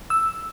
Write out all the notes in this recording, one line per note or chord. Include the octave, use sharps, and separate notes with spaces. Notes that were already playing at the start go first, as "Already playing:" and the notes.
E6